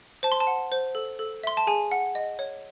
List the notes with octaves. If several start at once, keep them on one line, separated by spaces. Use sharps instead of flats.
C5 A5
C6
A5
F#5
C5
A4
A4
E5 C6
A5
G#4 G#5
F#5
D#5
C#5